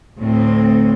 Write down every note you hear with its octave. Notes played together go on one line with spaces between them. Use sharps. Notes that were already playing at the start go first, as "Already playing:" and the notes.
D2 A2 C4